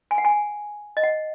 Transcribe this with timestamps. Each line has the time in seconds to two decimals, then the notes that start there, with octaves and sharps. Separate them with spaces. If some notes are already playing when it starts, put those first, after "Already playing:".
0.11 G#5
0.18 F#5
0.25 G#5
0.97 D#5
1.03 F#5